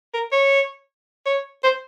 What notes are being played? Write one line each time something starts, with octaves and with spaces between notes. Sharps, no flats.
A#4
C#5
C#5
C5